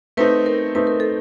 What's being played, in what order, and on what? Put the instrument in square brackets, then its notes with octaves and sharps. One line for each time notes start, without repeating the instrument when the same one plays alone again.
[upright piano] A3 C4 D#4 [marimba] B4
[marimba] A#4
[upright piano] A3 C4 D#4 [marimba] B4
[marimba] A#4
A4